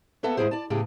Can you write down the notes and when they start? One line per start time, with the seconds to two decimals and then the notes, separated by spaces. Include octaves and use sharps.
0.23 A#3 B3 A4 E5 F#5
0.37 D#2 G#2 E3 E4 G#4 C5
0.51 D5 A5
0.70 E2 A2 C#3 G4 G#4